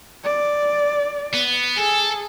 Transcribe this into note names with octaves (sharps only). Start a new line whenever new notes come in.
D5
B3
G#4 A4